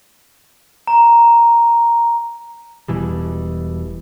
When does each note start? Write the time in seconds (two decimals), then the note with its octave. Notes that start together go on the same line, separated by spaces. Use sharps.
0.87 A#5
2.88 E1 B2 E3 G3